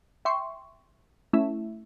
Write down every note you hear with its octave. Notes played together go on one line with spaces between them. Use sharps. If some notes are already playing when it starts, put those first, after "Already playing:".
E5 G5 C6 C#6
A3 C#4 E4 E5